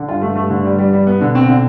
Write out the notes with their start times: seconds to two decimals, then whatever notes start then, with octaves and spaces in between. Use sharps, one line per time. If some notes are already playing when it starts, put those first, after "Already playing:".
Already playing: D3
0.09 G2 F4
0.22 A3
0.36 A3
0.50 D3
0.65 G3
0.78 G3
0.93 G3
1.07 B3
1.21 B2 D3
1.35 C4
1.48 D3